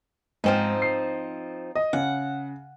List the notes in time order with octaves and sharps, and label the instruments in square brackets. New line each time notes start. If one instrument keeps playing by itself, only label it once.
[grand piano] G#2 [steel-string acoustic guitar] F3 C4 D#4
[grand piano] C7
D#5
[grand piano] C#3 [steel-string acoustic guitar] F#5